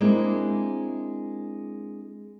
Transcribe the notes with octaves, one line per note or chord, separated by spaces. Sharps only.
G#3 A#3 C4 D4 E4 G#4